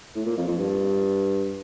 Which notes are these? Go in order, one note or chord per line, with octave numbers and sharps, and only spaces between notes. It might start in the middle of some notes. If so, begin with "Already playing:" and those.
A2
A#2
F2
F2
G2